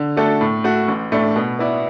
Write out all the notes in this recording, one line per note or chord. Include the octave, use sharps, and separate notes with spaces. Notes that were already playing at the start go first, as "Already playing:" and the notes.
Already playing: D3
A3 D4 F#4 A4
A2
A3 F#4
A1
A2 A3 D4
B2
B3 E4 D5